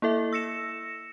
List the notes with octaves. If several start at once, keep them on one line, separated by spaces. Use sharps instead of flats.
A#3 E4 A4 E5
E6 A#6 C#7 E7